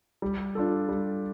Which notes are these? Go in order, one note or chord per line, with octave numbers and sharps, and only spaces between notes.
G3
D4 F4 A4
G3